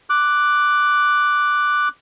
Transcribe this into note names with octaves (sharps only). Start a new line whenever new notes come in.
D6 F#6